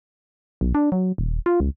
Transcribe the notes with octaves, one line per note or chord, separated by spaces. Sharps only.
B1
D4
F#3
D#1
F4
C#2